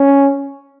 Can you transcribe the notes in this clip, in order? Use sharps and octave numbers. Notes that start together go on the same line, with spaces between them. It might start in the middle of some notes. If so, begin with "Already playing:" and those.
Already playing: C#4